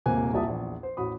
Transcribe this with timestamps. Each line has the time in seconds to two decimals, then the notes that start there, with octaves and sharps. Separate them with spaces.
0.06 D#1 G#2 C3 A#3 G#5 F#6
0.33 C2 A#2 G4 E5 A5 D#6
0.47 A#1 E2
0.83 C5
0.97 A1 F#4 B5 D#6